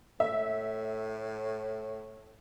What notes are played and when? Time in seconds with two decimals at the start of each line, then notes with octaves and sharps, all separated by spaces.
0.20 A2 E5